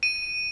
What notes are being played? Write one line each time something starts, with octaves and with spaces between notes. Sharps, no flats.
D#7